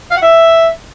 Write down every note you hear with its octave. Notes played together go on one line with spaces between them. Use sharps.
F5
F#5
E5